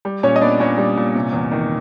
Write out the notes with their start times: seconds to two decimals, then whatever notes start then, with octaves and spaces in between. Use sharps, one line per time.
0.05 G3
0.23 A#2 C#4 C#5
0.36 D#5
0.41 B3 D4 D5
0.60 A#2 C#4 C#5
0.78 G3
0.97 A#2
1.15 C3
1.33 E2
1.51 D#3